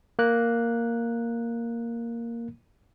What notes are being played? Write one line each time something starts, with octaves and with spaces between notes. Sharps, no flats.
A#3 F#6